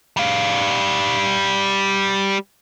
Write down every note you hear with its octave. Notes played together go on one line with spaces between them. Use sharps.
G3 F5